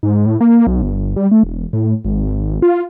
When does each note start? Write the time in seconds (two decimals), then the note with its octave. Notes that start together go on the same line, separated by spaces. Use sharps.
0.03 G#2
0.26 A2
0.41 A#3
0.67 B1
0.82 G1
1.16 G3
1.31 A3
1.43 E1
1.73 A2
2.05 G#1
2.62 F4